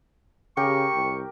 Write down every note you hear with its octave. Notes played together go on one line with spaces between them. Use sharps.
C#3 G4 A#4 G5 C#6
C2